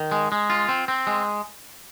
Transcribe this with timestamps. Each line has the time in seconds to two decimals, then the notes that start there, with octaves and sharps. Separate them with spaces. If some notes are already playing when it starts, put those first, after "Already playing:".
Already playing: D#3
0.12 G#3
0.32 G#3
0.50 F4
0.69 C4
0.88 C4
1.07 G#3